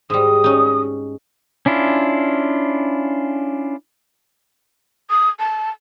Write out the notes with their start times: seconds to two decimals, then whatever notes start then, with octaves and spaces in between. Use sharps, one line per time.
0.10 G#2 G3 D#6
0.44 C#4 D#4
1.66 C#4 D4 E4 F4
5.10 D#6
5.40 A5